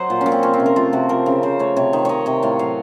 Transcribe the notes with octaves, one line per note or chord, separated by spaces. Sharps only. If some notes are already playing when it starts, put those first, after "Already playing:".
Already playing: F#3 C5 D#5 F#5
A#2
C#4
A#2
C4
F3 C#4
C4
C3
A#4
A3 F4
C3 F#4
F3 A#4
C#3
C#3 C5
A3 C#5
C3 C#5
D#3
D#3 C#5 D#5
C3 C#5
A2 F5
F#3 F5